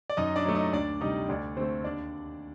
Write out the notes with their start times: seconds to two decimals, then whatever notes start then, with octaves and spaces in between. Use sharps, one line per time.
0.10 D5
0.17 F#2 D#4 D#5
0.36 D4 D5
0.45 F#3 A3
0.55 D#4 D#5
0.73 D2 D4 D5
1.01 C3 G3 D#4 D#5
1.28 D2 D4 D5
1.56 D3 A3 C4 C5
1.84 D#2 D4 D5